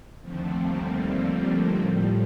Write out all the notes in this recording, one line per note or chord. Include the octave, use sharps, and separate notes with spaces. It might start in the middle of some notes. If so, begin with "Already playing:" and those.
D#2 D3 F3 A3 C4
G3 A#3
A3
G3
A2 F3